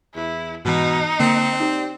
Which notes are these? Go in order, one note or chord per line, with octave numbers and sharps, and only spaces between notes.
E2 E4
G#2 B2 E3 D#4
D3 A#3 C4
D#4 G4 D5